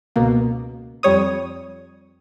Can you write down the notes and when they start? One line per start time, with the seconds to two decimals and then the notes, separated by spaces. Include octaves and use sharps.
0.16 C#2 B2 A#3
1.03 F2 G3 C#5 D#6